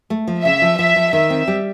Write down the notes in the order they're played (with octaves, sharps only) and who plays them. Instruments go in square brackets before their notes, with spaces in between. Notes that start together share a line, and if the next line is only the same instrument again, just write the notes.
[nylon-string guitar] A3
F3
[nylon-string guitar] C#3 [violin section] E5
[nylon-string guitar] F3
[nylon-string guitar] F3 [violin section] E5
[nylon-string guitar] F3
[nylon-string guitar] D#3 [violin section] E5
[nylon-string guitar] C4
G3